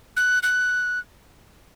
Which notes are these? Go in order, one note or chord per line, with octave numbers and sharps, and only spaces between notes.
F#6
F#6